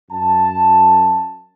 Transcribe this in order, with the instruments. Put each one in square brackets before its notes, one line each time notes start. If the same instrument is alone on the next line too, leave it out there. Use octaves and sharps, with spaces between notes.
[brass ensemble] F#2 A5